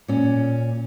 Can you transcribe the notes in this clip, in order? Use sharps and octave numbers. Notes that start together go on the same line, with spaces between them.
A#2 C#4